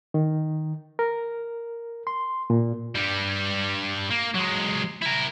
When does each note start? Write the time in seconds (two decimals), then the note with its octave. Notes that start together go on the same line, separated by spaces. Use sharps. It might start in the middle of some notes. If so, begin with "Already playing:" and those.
0.14 D#3
0.99 A#4
2.07 C6
2.50 A#2
2.95 G2 G3
4.10 A#3
4.35 F#3 G#3
5.02 E4 A#4